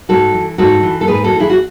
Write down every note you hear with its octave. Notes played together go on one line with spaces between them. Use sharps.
G#2 F#4 A4
E3
G#2 F#4 A4
E3
A4
G#2 G#4 B4
F#4 A4
E3
E4 G#4
F#4